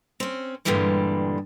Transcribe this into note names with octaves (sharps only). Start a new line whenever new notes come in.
C4 C#4
G2 A#2 D3 E3 G3 G#3